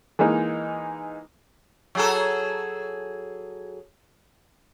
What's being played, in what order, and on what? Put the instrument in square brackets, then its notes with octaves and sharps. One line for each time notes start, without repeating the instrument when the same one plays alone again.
[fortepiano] E3 G#3 A#3 D#4
[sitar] F#3 G#4 A4